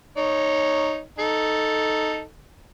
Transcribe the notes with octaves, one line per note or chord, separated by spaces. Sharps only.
D#4 C#5
D#4 A4